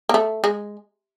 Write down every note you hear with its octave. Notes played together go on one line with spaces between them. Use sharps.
A#3
A3
G#3